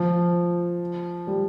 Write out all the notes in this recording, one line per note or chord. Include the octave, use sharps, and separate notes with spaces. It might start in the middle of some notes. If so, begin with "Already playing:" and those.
Already playing: F3
G3